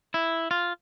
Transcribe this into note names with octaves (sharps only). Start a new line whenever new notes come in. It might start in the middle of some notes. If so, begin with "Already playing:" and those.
E4
F4